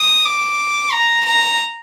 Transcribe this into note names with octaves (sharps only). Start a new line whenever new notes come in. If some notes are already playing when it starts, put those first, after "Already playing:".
Already playing: D#6
D6
A#5
A#5